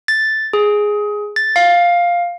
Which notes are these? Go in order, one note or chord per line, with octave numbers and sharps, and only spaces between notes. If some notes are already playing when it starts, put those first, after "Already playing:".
A6
G#4
A6
F5